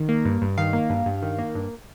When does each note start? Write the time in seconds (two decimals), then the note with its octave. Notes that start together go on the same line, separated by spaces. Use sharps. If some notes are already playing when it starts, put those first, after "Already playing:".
Already playing: D#3
0.09 A#3
0.25 G2
0.42 G2
0.58 D#3 F5
0.73 A#3
0.90 G2
1.06 G2
1.23 D#3
1.39 A#3
1.55 G2